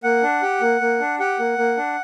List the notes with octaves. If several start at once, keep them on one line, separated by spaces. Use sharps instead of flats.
A#3 F#5
D4
G4
A#3
A#3
D4
G4 F#5
A#3
A#3
D4